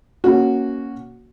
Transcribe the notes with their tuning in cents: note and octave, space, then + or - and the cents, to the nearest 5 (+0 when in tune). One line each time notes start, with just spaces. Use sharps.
A#3 +10 C#4 +0 F#4 +0